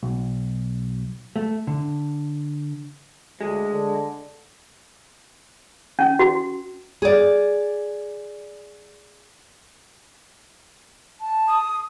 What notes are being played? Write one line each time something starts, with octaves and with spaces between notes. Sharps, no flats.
B1
A3
D3
D2 G#3
D3
C#4
F#4
G#4 D5
A5
D#6